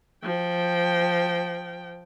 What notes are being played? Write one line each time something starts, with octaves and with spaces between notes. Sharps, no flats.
F3 G5